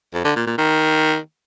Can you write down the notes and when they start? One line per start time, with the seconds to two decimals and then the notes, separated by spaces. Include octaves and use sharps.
0.14 F2
0.25 D3
0.36 A#2
0.47 A#2
0.58 D#3